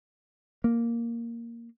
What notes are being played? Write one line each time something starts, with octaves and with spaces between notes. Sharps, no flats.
A#3